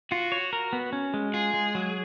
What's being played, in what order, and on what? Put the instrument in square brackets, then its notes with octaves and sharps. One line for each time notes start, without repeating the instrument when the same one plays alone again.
[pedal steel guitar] F4 [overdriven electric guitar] F#4
[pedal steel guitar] C#5
A#4
B3
C#4
G#3
[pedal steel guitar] F4 [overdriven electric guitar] G#4
[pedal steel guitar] G#3
F#3